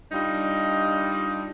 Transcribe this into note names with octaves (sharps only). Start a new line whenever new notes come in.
G3 D4 D#4 F4 D#5